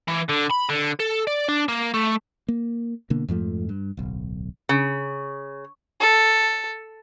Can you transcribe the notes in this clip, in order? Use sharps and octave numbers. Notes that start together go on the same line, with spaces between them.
E3
D3
B5
D3
A4
D5
D4
A#3
A3
A#3
B2 D3 A#3
F2 G#2 F3 A3
G2
D1 B1
C#3
A4